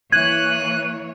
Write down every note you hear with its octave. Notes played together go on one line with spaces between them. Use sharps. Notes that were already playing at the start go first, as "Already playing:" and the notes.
E3 A#3 C#5 F#6 G#6 D#7